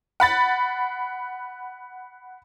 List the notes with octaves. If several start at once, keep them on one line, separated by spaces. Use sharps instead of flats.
F#5 B5 A6